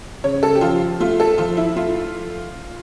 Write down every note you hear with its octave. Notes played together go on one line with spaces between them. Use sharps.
C#3 C#5
A4
G4
F3 F4
A3 F4
A4
F3 F4
E4
A3 F4